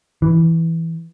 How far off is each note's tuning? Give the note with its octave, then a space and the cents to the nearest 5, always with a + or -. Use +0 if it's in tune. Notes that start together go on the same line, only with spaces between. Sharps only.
E3 -5